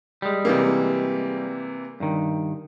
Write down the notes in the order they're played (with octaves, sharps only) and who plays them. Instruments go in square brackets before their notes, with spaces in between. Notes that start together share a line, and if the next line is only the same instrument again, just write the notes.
[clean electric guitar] G3 G#3
[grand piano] C3 E3 A#3
[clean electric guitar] G2 D#3